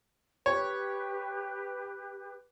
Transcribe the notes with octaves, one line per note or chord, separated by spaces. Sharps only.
G4 B4 C#5